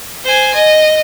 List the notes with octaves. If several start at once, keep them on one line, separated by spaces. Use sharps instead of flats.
C5 G#5
D#5